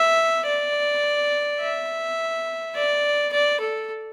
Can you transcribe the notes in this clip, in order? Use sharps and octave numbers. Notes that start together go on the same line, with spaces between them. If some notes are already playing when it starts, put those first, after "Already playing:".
Already playing: E5
D5
E5
D5
D5
A4